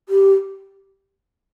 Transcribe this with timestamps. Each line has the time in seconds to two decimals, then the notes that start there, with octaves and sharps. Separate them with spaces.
0.09 G4